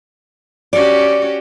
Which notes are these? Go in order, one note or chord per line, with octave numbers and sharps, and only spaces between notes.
C#4 F#4 G4 D5